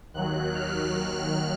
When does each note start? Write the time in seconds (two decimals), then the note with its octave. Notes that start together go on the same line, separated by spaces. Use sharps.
0.14 D#2 D#3 F#3 F#6
0.54 F6